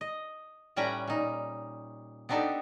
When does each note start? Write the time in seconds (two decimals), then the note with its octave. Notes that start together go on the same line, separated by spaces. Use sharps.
0.01 D#5
0.76 A2 G3 C#4 B4 G5 A#5
1.07 A#2 D#4
2.29 B3 C4 D4 D#4 G4 A4